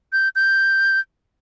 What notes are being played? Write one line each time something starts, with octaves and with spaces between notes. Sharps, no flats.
G6
G6